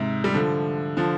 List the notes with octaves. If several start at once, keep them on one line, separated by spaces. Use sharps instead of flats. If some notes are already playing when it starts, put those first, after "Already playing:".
Already playing: G#2 C3
G3
D3 F3
D3 F3